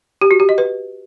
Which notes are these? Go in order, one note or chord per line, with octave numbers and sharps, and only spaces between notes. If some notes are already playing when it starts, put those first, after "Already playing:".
G4
F#4
G4
D#5
B4